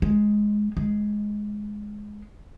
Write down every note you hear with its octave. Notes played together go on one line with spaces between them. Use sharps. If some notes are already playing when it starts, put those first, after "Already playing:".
G#3
G#3